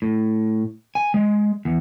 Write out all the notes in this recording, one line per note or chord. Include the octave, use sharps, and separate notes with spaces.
A2
G#5
G#3
E2